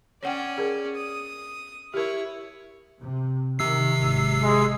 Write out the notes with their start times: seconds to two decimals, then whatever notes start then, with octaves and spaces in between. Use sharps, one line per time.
0.23 C#4 C#5 D5 F#5 G5
0.58 G#4 A#4
0.95 D#6
1.94 E4 G4 A#4 C#5
2.99 C3
3.59 C3 D#3 E6 C7
3.98 G#1 F#3
4.43 G#3